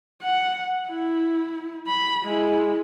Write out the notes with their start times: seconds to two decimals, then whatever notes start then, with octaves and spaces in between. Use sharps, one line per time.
0.22 F#5
0.88 E4
1.87 B5
2.24 G#3 E4